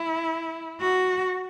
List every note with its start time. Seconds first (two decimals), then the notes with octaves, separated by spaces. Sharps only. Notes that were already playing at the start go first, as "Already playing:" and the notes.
Already playing: E4
0.81 F#4